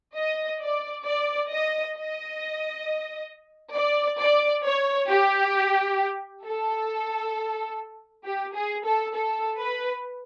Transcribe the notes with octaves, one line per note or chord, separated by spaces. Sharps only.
D#5
D5
D5
D#5
D#5
D5
D5
C#5
G4
A4
G4
G#4
A4
A4
B4